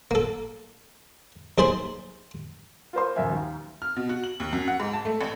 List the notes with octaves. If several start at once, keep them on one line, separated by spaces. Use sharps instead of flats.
A#3 A4
D#2 G#4 C5 A5 B5 C6
F4 A#4 C5 C6
D#1 F#2 F3 A#4 E5 G#5
D#2
F6
B2
F#4
F#7
D#2
F#2
F#5
G#2
A5
A3
A1